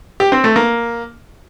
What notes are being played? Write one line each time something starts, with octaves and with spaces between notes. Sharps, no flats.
G4
C4
A3
A#3